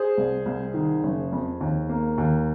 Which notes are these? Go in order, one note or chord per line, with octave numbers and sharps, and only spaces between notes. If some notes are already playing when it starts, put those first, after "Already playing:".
Already playing: G#4 C5
C2
C2
D#3
F#1
F2
D#2
A#3
D#2